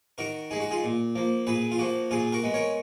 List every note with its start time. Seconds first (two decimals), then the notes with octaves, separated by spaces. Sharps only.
0.18 D#3 F#4 A#4
0.51 G#3 D#4 G#4
0.60 F#4
0.71 F4 G#4
0.83 A#2
1.15 F3 A#3
1.47 A#2 G#4 B4
1.72 F4
1.79 F3 A#3 F#4
2.11 A#2 F4 G#4
2.32 F#4 A#4
2.44 G#3 B3
2.54 A#4 C#5